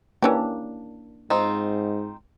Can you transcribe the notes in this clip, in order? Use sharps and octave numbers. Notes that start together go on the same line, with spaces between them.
E3 A#3 C#4 D4 G4
G#2 C4 D#4 F4